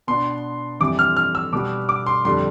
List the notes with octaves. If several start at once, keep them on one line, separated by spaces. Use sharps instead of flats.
B2 B3 D4 C6
F2 E3 G3 C4 D6
F6
F6
E6
B2 G3 B3 D6
D6
C6
F2 D3 G3 D4 C6